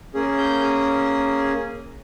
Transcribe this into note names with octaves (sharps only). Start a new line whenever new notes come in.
A#3 C#4 G#4
G6